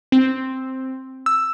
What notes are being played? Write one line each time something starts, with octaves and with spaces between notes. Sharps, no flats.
C4
E6